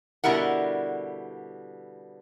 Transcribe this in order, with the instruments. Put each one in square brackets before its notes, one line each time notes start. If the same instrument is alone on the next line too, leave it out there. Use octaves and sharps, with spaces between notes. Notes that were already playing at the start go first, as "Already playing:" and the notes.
[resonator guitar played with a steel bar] B2 D3 G3 E4 A#4 F#5